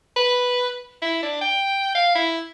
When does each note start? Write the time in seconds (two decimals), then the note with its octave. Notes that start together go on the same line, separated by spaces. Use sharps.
0.17 B4
1.02 E4
1.23 D4
1.41 G5
1.95 F5
2.15 E4